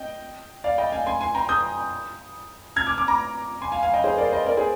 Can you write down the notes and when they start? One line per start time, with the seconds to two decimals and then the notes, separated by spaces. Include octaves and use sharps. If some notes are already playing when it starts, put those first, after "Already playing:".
Already playing: D#5 G5
0.64 D5 F5
0.78 D#5 G5
0.92 F5 G#5
1.06 G#5 C6
1.21 G#5 C6
1.35 G5 A#5
1.49 D#6 G6
2.76 F6 G#6
2.87 D6 F6
2.98 D6 F6
3.08 A#5 D6
3.62 G#5 C6
3.72 F5 G#5
3.83 F5 G#5
3.94 D#5 G5
4.04 G#4 C5
4.18 A#4 D5
4.32 C5 D#5
4.46 A#4 D5
4.57 G#4 C5